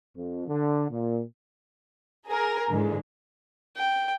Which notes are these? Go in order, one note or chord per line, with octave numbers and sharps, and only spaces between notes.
F2
D3
A#2
G#4 A#4
G#2 D3 E3 G#3
G5